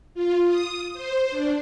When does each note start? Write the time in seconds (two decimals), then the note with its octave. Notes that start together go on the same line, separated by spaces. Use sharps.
0.14 F4
0.46 D#6
0.93 C5
1.30 D4